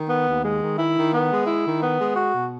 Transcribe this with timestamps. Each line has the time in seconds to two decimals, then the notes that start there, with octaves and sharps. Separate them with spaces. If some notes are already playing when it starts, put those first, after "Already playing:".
Already playing: D#3
0.09 B3
0.28 D#2
0.45 G#3
0.62 D#3
0.78 E4
0.96 D#3
1.13 B3
1.30 G#3
1.47 E4
1.65 D#3
1.82 B3
1.99 G#3
2.16 F#4
2.33 B2